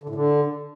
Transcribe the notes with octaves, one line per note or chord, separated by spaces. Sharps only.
D3
A2
D3